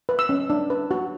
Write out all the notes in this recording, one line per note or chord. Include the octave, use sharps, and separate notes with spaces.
B4
E6
C#4
D4
B4
F#4